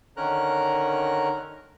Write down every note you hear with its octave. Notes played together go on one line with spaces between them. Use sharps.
D3 D#3 C#4 A#4 A#5 F#6